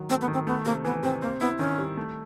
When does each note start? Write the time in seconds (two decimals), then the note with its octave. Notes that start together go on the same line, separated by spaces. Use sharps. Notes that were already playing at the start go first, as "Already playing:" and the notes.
Already playing: D#3 F#3
0.10 A3 C4
0.21 B3
0.28 D#3
0.34 C4
0.47 A3 B3
0.65 C3 A#3
0.85 E3 B3
1.03 C3 C4
1.22 A#3 C4
1.40 B3 E4
1.59 D#3 C#4
1.78 G3
1.97 A3